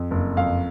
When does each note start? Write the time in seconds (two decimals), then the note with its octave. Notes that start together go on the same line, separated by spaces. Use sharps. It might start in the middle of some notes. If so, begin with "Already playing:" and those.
Already playing: F2
0.11 F#1
0.37 F2 F5